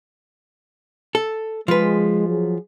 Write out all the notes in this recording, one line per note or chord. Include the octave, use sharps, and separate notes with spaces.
A4
F3 G#3 B4
F#3 G#4